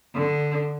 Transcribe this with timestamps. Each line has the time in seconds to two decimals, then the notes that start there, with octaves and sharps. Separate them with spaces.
0.15 D3